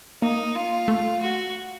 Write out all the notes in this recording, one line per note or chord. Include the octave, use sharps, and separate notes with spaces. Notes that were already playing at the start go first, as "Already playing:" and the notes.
A#3 D#4
F4
A3
F#4